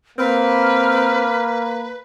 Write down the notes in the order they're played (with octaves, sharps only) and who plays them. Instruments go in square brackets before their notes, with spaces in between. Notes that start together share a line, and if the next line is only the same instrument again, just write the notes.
[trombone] A#3 [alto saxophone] C4 [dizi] B4 [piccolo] F6